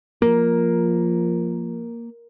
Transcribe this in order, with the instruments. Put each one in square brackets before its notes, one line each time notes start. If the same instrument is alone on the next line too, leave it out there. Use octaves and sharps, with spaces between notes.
[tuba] F3 [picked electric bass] A#3 [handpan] A#4